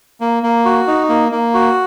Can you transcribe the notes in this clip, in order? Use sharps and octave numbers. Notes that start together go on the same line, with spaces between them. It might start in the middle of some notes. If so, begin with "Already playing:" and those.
A#3
A#3
F#4
D#4
A#3
A#3
F#4